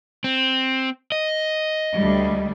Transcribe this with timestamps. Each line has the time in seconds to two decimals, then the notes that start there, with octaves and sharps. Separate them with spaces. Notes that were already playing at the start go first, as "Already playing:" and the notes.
0.24 C4
1.12 D#5
1.96 D2 G3